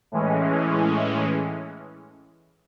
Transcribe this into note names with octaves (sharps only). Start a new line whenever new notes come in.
A2 E3 G#3 C#4